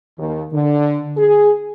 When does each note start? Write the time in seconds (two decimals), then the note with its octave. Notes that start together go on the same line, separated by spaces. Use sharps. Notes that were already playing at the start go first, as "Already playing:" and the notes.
0.18 D#2
0.53 D3
1.18 G#4